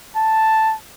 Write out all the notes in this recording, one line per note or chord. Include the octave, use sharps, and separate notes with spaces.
A5